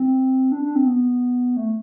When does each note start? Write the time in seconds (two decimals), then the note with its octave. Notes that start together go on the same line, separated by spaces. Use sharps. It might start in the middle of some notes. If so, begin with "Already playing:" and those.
Already playing: C4
0.52 D4
0.63 D4
0.75 C4
0.86 B3
1.57 A3